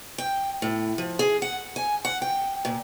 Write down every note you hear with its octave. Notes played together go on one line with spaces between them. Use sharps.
G5
A2
F3
G#4
F#5
G#5
F#5
G5
A#2